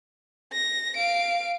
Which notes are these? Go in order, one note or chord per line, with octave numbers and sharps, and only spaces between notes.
A#6
F5 D7